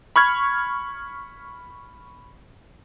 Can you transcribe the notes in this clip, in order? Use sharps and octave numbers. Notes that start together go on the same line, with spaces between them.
B5 C#6 F6 G#6